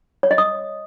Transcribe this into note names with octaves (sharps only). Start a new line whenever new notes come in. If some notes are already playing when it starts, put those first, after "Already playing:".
C#5
D#5
D#6